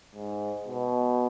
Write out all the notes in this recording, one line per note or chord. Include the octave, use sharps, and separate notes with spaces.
G#2
B2